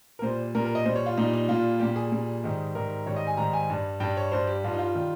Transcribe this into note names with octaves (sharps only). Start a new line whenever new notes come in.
A#4
A#2 G3 C5
A#2 G3 A#4
A#4
D#5
A#2 G3 C5
C#5
F4
A#2 G3 D#4
D#4
A#2 G3 F4
A#2 G3 G4
G#4
A#2 G3
G#2 D#3 G3
G#2 D#3 G3 A#4
G#2 D#3 G3 C#5
D#5
G#5
G#2 D#3 G3 A#5
G#5
G2 G3
G2 G3 G5
C#5
G2 G3 C5
G4
G2 G3 F4
D#4
F4
D#3 G3